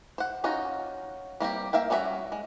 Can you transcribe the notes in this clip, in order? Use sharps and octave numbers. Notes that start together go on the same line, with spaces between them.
C5 F#5
C#4 D#4 F4 F#4
G3 A#3 C4 G4
A#3 E5 F5 G5
G3 C#4 D4 F#4 E5
G#3